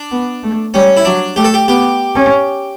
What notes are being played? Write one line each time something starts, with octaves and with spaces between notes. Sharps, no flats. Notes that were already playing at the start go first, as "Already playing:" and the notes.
Already playing: D4
B3
A3
G3 C#4
E4
F#3 D4
A3 G4
A4
G4
B3 G4
C#4